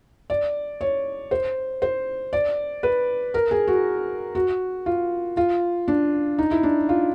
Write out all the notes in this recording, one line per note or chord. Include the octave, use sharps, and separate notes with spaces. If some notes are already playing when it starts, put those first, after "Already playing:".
D5
C#5
C5
C5
D5
B4
A#4
G#4
F#4
F#4
F4
F4
D4
D#4
E4
D4
F4